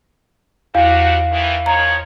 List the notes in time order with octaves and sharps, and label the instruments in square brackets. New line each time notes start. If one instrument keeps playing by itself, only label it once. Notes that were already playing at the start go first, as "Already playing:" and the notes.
[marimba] E2 [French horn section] C3 G3 F#4 [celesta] F5
[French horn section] D#3 E3
[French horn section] D#3 F3 C#5 [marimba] A#5